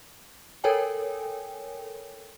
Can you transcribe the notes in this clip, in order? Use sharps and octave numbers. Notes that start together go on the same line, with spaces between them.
A4 A#4 C#5 G5 G#5